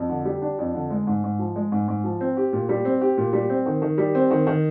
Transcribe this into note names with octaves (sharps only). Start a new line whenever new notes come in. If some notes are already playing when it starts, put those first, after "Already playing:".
Already playing: F2
D3
G3
D4
F2
D3
G#3
G#2
G#2
F3
G#3
G#2
G#2
F3
C4
G4
A#2
G3
C4
G4
A#2
G3
C4
D#3
D#3
G3
C4
D#3
D#3